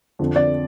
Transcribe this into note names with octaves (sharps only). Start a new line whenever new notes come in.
F2 D3
D5